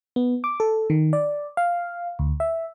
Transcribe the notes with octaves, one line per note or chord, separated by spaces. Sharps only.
B3
D6
A4
D#3
D5
F5
D2
E5